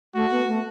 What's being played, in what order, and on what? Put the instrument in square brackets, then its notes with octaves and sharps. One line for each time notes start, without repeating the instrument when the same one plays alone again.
[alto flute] A3 [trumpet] F#4
[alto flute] B3
A3